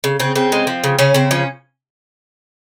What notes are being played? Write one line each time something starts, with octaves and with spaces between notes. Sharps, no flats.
C#3
C#3 C4
C#3 C4
G#3
F3
C#3
C#3 C#4
C#3 C4
F3 C#4